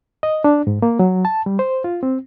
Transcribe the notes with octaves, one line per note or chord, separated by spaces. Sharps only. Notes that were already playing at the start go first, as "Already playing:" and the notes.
D#5
D4
G#2
A#3
F#3
A5
G3
C5
F4
C4